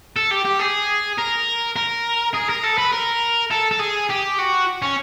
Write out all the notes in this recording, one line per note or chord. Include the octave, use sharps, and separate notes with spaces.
A4
G4
G4
G#4
A#4
A#4
G#4
A#4
A4
B4
A#4
A4
A4
G#4
G4
F#4
C#4